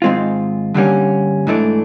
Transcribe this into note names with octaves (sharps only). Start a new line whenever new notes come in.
G#2 D#3 G#3 C4 F4
G2 D3 G3 A#3 C#4
G#2 E3 A3 D4